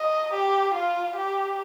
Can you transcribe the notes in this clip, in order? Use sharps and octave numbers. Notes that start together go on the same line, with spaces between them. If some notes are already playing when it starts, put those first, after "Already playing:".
Already playing: D#5
G4
F4
G4